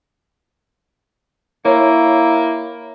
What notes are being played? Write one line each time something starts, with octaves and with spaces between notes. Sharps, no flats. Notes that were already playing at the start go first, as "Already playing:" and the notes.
A#3 E4 C#5